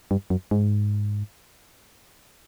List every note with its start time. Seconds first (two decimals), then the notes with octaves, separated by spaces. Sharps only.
0.11 G2
0.30 F#2
0.51 G#2